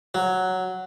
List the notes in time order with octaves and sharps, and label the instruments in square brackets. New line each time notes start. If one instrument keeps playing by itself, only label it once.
[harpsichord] F#3